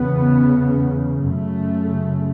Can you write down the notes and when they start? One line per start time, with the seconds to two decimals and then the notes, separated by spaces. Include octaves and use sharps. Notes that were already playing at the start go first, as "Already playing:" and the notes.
Already playing: E2 C#3 B3
1.24 F#2 C#3 A3